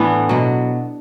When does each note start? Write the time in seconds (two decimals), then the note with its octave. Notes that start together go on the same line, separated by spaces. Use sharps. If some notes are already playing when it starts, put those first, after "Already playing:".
Already playing: A2 E3 B3 D4
0.29 B2 F#3